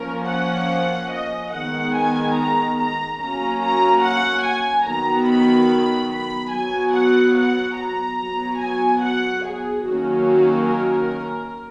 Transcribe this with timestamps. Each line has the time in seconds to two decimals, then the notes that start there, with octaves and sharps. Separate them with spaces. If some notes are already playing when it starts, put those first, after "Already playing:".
Already playing: F3 A#3 C#4 A#4
0.29 F#5
1.12 D#5
1.54 D#3 G#3 B3 F#5
1.96 G#5
2.37 A#5
2.78 A#5
3.20 F#3 A#3 C#4 A#5
3.62 A#5
4.03 F#5
4.45 G#5
4.87 D#3 F#3 B3 A#5
5.28 B5
6.11 B5
6.52 F#3 B3 G#5
6.94 F#5
7.36 F#5
7.77 A#5
8.19 F#3 B3
8.61 G#5
9.02 F#5
9.44 G#4
9.85 D#3 F#3 A#3 C#4 F#4
10.27 F#4
10.69 A#4